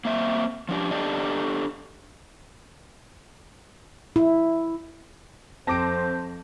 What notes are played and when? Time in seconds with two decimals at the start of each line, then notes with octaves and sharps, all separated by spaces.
0.05 A#3 C4 E5
0.69 F3 D4 G4
0.91 D4 G4 A4 D5 D#5
4.16 E4
5.67 F2 C4 C5 A5 D6 A#6 D7